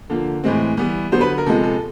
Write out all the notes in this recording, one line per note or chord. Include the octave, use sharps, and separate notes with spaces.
D3 F3 A#3
A2 E3 G#3 C4
E3 G3 B3
D3 F#3 B3 C5
B4
A#4
C3 F3 G#3 B3 A4
A4